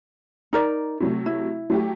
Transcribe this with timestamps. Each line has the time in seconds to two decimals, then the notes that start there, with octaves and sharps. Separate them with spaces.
0.53 D#4 A#4 D5
1.00 C3 F#3 A3
1.26 E4
1.70 F#3 A3 G4